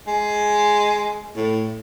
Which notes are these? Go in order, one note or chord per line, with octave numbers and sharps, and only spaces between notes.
G#3
A2